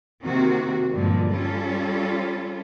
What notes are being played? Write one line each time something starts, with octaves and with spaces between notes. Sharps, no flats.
C3 D#3 A#3 C4 F#4
G2 A#2 D3 F3 G#3
G3 C#4 F4 A4